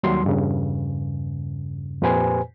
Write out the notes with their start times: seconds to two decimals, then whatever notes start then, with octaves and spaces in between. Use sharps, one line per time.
0.03 D#2 F#3 G3 C6
0.24 E2 G2 C#3
2.02 F2 A#2 G4 B4 C5 G#5